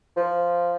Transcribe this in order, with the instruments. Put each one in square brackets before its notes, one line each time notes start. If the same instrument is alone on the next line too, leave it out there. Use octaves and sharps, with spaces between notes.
[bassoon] F3